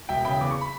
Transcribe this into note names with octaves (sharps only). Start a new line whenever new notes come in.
E1 E5 G5
C#3 G5 B5
E2 D6
C#6
B5